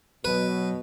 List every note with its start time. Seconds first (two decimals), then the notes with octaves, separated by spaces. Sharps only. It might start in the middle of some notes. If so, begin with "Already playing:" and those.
0.25 B2 F#3 B4